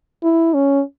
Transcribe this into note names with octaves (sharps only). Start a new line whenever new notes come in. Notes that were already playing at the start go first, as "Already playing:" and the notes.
E4
C#4